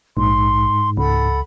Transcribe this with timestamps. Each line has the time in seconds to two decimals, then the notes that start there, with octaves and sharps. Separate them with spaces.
0.17 A#1 G#2 C6
0.97 C#2 A4 F#5 B5